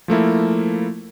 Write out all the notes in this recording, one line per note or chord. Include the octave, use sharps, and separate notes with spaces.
F3 A3 A#3 E4